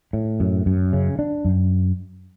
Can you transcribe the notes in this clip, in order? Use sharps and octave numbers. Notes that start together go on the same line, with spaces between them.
A2
F#2
F#2
C#3
D4
F#2